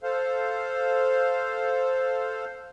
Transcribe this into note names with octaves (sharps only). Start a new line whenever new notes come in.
A4 C5 F5